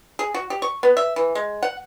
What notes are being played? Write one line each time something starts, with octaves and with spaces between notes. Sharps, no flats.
G#4
F#4
G4
C#6
B3
E5
E3
G#3
F#5